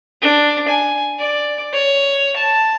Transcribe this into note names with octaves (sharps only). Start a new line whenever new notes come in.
D4
G#5
D5
C#5
A5